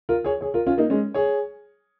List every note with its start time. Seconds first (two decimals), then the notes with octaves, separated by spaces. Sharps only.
0.09 F4 A#4
0.24 G#4 C#5
0.41 G#4 C#5
0.54 F4 A#4
0.66 C#4 F4
0.78 A#3 D#4
0.90 G#3 C#4
1.14 G#4 C#5